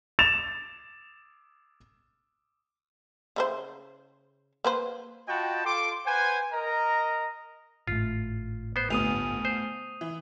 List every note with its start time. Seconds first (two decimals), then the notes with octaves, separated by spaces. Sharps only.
0.19 A6 E7 F7
3.36 C#3 E4 C5
4.64 A#3 B4 C5
5.28 F4 F#4 D#5 G5 A5 B5
5.64 F4 A4 C6 D6
6.06 B4 C5 F#5 G#5
6.52 A#4 D#5 A#5
7.87 G#1 A2 F4
8.76 B3 C5
8.90 G1 D2 B2 D#6 D#7 F7
9.45 C5
10.01 E3